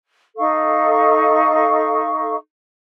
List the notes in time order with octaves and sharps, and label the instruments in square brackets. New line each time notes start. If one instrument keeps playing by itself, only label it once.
[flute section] D#4 A4 F5 C#6